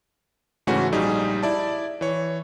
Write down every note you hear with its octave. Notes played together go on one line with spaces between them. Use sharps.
G#2 C#3 E3 A3 C#4 F#4
A#1 G3 D#4 G#4
E4 D5 A5
E3 C#5